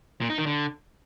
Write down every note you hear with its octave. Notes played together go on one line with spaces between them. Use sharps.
A#2
D#4
D#3
D3